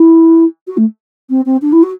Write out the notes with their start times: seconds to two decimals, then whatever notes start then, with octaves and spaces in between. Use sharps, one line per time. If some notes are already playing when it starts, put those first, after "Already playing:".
Already playing: E4
0.67 F#4
0.77 A3
1.30 C4
1.46 C4
1.62 D4
1.72 E4
1.83 F#4